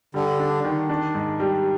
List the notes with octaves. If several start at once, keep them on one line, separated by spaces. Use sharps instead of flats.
D3 G3
D4
D#3
D4
G#2
G3